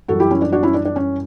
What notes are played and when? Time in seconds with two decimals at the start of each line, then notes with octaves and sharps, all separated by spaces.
0.08 F#2 E3 G3 F#4 A4
0.20 E4 G4
0.30 C#4 E4
0.42 D4
0.52 D4 F#4
0.63 C#4 E4
0.74 D4
0.85 D4
0.96 C#4